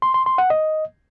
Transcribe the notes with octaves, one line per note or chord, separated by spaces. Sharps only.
C6
C6
C6
F#5
D#5